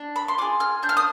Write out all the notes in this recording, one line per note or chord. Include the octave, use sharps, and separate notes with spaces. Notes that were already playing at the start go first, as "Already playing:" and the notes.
Already playing: D4
B5
C6
F4 G#4 D6
F6
D4 G6
F6
D#6